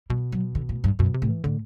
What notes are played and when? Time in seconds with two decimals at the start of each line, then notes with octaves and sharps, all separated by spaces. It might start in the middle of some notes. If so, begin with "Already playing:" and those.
0.10 B2 G3
0.32 F#3
0.55 D3
0.69 A2
0.84 G2
0.99 F#2 B2
1.14 C3
1.22 A2
1.29 E3
1.44 A2 D3